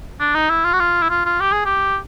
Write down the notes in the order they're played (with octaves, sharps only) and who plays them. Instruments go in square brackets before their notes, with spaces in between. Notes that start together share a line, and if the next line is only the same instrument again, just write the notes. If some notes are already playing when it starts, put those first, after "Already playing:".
[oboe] D4
D#4
E4
F4
F#4
F4
E4
F4
F4
G4
G#4
G4